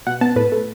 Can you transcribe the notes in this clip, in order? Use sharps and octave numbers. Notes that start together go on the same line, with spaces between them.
B2 F#5
B3 A5
A2 B4
A3